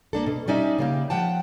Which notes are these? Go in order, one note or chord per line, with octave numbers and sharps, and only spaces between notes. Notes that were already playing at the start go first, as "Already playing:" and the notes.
A#3 D4 A4
B2
G3 C#4 D#4 D5 E5
C#3 A#3 G4
F3 F#5 G5 A5